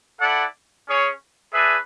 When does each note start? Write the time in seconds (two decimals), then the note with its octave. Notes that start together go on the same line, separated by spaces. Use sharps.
0.20 E4 A4 D5 F#5
0.87 C#4 G#4 C#5
1.53 D4 G#4 B4 E5